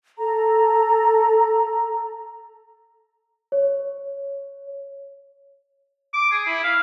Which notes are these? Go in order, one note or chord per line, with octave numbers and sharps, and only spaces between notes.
A4 A#5
C#5
D6
G#4
E4
F5